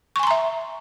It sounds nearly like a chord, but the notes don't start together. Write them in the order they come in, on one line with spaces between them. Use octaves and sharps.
C#6 G#5 C6 A#5 E5